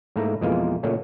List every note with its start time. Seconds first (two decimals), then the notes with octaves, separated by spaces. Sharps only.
0.16 G#2 A3 A#3 E4 A#5
0.41 F2 B2 E3 G#3 A#3 F4
0.83 A#2 C#3 F#3 A3